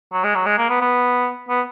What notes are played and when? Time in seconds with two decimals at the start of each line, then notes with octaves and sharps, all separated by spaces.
0.13 F#3
0.24 G#3
0.35 F#3
0.46 G#3
0.58 A#3
0.70 B3
0.81 B3
1.49 B3